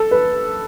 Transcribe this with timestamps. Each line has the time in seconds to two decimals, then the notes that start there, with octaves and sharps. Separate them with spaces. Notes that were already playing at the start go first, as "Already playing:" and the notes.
Already playing: A4
0.11 B4